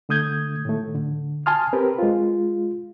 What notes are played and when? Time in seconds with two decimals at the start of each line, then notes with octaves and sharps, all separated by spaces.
0.09 D3 A3 D#6 G6 G#6
0.65 A2 D#3 A3
0.95 D3
1.46 G#5 A5 C6 D#6 F6
1.73 C4 G4 A#4 B4
1.99 G#3 F4